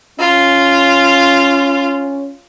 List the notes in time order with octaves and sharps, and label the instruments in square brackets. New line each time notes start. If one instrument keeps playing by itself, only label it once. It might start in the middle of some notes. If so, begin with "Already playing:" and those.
[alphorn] C#4 [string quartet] F4